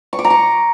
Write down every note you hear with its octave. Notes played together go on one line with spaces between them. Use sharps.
C#6
D6
A#5
C#6